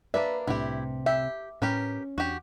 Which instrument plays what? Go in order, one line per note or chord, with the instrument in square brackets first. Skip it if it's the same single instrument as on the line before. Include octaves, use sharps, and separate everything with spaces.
[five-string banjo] A#3 D4 E5 [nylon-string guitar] B4 [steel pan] D5
[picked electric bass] C2 A2 D4 [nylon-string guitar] C3 [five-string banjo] E4 G4
[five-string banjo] G4 [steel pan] E5
[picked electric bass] A2 [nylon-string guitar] C#4 [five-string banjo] G4 A#4 B4
[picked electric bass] E2 D4 [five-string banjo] F#4 G4